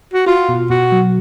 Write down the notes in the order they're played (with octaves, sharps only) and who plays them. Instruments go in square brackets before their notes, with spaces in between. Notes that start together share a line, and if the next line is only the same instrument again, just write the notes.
[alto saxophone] F#4
[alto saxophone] F4 [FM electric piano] F#4
[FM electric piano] B2
[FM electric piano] B2 [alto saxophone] F#4
[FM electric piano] F#3